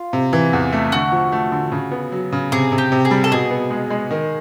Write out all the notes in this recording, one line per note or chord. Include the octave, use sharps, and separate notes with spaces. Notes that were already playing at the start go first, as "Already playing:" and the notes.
Already playing: F4
C3
E3
E2
A3
D3 F#4
F3
A3
D3
C#3
B3
F#3
C#3
C3 G#4
C3
G4
C3
G#4
G3
A4
B2 G#4
B3
G#3
G#3
D#3